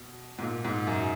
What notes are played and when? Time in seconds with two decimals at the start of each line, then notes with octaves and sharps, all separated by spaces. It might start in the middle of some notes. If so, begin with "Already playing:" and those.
Already playing: B2
0.39 G#2
0.42 A#2
0.65 G#2
0.87 F#2